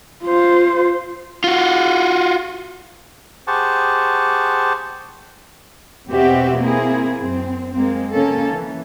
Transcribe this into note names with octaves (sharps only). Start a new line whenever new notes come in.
F4 C5
F4 F#4
G4 G#4 C5 F#5 A5 C#6
E2 B2 C4 F#4 G4 E5
A#3 C4 E4 G#4
F#2 C4
G#3 A#3 C4
C#3 A#3 C#4 A4
E3